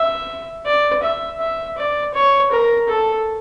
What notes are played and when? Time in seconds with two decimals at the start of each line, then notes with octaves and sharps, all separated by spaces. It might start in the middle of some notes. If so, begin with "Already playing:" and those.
Already playing: E5
0.66 D5
1.03 E5
1.40 E5
1.77 D5
2.14 C#5
2.52 A#4
2.89 A4